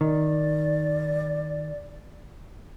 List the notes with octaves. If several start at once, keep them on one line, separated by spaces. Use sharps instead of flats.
D#3 D5